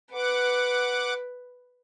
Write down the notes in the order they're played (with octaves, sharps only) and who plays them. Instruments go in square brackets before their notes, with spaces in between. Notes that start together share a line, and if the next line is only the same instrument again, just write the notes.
[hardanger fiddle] B4 [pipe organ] F#5 D6